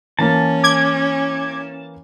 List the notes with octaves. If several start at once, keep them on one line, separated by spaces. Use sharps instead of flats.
E3 A#3 C#4 A5
D6 G#6